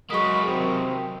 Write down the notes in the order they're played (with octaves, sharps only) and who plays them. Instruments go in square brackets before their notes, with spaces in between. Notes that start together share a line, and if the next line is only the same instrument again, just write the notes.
[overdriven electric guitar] F#3 A#3 [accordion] G#3 [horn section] F#4 A4 B5 [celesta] C#6 D#6
[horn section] C3 D#3 [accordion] C4